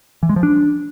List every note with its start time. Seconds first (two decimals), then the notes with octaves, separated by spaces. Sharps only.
0.23 E3
0.29 G#3
0.36 F3
0.43 D4